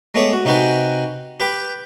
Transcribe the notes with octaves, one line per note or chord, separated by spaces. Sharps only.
G#3 A3 B3 G#4 C#5 D6
F#4
C3 D#4 F#4 G4 B4 G#5
G4 B4 G5 B5 D6